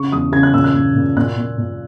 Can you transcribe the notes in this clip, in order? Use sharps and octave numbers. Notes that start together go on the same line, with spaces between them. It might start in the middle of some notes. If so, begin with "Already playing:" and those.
Already playing: C#3 C#6
E2 D#6
C#3 G#6
F#6
A#2 E6
F#6
A#2
A#2
A#2 F#6
A#2
A#2